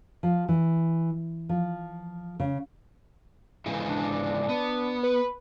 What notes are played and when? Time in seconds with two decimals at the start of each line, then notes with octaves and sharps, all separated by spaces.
0.23 F3
0.49 E3
1.49 F3
2.40 C#3
3.66 G#2 C#3 E3
3.89 D4
4.49 B3
5.03 B4